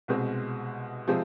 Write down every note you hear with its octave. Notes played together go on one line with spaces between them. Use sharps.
C2 B2 G#3 C4
C3 F3 G#3 C4